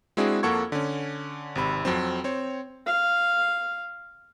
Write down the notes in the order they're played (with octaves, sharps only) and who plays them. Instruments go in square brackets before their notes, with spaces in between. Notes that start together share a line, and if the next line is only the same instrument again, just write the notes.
[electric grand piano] G#3 C4 D4 E4 F#4 G#4
F2 A#3 A4 F#5 C#6 G#6
D3 C#4
G#1 C3 B5
F2 F#3 C4
C4 C#5
[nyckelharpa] F5